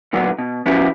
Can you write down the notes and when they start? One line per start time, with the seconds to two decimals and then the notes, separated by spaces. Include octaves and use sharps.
0.13 A#2 D3 F#3 B3
0.38 B2
0.66 F3 B3 C#4 E4 F#4 G4